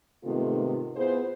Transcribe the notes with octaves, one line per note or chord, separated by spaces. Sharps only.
G#2 C3 D#3 A3 B3 F4
B3 E4 F4 G#4 C5